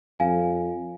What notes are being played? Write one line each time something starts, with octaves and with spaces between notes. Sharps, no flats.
F2 F5 G#5